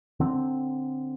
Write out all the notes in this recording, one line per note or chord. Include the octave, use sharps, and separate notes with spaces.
D3 C4